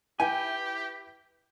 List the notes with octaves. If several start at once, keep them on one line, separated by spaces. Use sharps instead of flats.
E4 G4 B4 G5 G#5